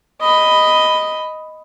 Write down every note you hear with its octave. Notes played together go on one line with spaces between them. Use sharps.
D#5 B5